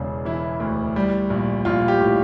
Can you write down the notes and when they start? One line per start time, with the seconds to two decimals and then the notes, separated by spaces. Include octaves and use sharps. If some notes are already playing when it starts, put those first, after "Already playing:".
Already playing: E1 C#3 D4
0.25 E3 E4
0.60 D2
0.96 G3
1.30 A#1
1.65 A#1 F4
1.88 G4
2.00 A2